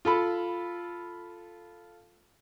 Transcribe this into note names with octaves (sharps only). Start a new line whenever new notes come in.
F4 A4 B5